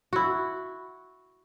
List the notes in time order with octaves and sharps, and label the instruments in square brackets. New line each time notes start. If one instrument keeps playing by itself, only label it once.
[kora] E4 F#4